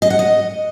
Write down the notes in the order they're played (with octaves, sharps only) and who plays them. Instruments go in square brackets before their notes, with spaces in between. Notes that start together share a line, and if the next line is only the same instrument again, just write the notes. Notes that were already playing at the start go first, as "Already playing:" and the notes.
[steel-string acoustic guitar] D#5
F#5
D#5